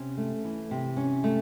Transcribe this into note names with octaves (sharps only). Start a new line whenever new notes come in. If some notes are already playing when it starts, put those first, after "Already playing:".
Already playing: C3 C#4
A3
E3
C3
C#4
A3